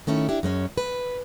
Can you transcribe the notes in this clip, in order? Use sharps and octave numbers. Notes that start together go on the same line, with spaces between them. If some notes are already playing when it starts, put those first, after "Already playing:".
D#3 A3 C#4 E4
D4 E4 G4
F#2 G#3 C#4
B4